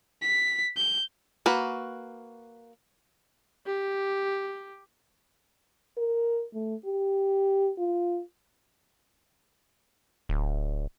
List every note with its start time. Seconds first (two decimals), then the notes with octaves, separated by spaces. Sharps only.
0.22 B6
0.77 G6
1.46 A#3 F#4 B4
3.66 G4
5.97 A#4
6.54 A3
6.85 G4
7.78 F4
10.29 D1